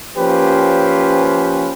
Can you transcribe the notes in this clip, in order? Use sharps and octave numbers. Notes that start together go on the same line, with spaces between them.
F3 A#3 C#4 G4 B4 C5